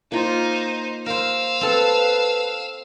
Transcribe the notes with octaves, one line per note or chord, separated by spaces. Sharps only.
A#3 D#4 F4 C5
A#4 C5 F5 E6
C4 A4 B4